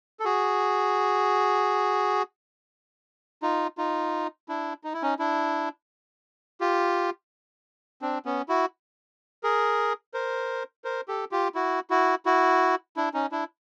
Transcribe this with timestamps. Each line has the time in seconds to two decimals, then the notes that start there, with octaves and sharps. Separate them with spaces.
0.20 A4
0.24 F#4 G#4
3.42 D#4 F4
3.78 D#4 F4
4.49 D4 E4
4.84 D#4
4.94 E4
5.02 C#4 D#4
5.19 D4 E4
6.61 F4 G4
8.02 C4 D4
8.25 B3 C#4
8.49 E4 F#4
9.43 G#4 A#4
10.14 A#4 C5
10.84 A#4 C5
11.08 G4 A4
11.32 F4 G4
11.55 E4 F#4
11.90 E4 F#4
12.26 E4 F#4
12.97 D4 E4
13.14 C#4 D#4
13.32 D4 E4